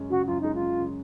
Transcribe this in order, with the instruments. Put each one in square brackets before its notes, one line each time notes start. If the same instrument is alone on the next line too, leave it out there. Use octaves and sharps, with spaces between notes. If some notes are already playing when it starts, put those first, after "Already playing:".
Already playing: [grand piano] F#2 C#3 G#3 C#4
[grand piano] C#3 [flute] F#4
[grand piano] F#2 [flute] F4
[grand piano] G#3 [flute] D#4
[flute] F4
[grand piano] C#4
C#3